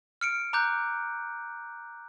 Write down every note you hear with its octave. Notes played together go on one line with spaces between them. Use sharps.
F6 C#7 D7
A#5 D6 F#6 G6